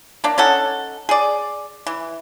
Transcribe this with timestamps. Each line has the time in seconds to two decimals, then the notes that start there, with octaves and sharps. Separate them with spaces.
0.24 A#3 D4
0.38 C#4 D#4 A4 F#5
1.09 G#4 D5
1.87 E3